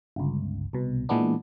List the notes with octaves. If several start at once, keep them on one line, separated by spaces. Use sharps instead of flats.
G1 C#2
C2 B2
A#2 E3 G#3 B3 D4